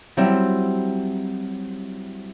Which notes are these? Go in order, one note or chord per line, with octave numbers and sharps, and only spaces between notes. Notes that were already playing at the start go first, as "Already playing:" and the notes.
F#3 G3 C4 E4 E5